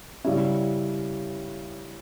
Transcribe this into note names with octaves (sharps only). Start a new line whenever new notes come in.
C#3 G3 C#4 E4